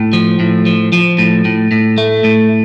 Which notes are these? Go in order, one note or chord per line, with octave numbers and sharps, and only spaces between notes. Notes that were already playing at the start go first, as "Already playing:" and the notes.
Already playing: A2
F3
A2
F3
F3
A2
A2
A2
A3
A2